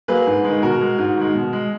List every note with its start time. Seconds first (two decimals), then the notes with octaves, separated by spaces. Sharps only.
0.08 F#3 A#3 G#4 B4
0.27 G#2
0.44 G#3
0.50 D#3
0.62 B2 F#4 A#4
0.81 G#3
0.98 G#2
1.17 D#3 G#3
1.35 B2
1.53 G#3